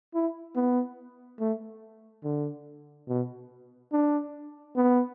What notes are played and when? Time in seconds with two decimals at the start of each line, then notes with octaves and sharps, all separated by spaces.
0.14 E4
0.56 B3
1.40 A3
2.24 D3
3.08 B2
3.92 D4
4.76 B3